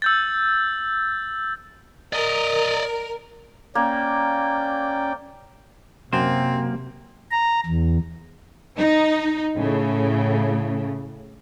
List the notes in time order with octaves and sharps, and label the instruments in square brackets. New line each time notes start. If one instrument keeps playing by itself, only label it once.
[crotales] E6 G6 A6
[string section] A#4 [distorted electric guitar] D5 D#5
[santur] A#3 [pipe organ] C#4 D5 G5
[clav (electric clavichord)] F#2 C5 [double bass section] C3 [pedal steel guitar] A#3 [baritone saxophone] C4
[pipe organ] A#5
E2
[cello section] D#4
A2 C#3